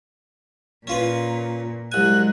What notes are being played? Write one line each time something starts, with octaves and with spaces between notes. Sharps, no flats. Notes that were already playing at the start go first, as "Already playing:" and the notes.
A#2 C#4 F4 B4
C2 F#3 G#3 G#5 F#6